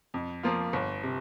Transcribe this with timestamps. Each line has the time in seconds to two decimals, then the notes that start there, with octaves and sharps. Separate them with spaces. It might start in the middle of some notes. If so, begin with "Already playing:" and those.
0.14 F2
0.43 F3 A#3 F4
0.73 G1
1.03 C3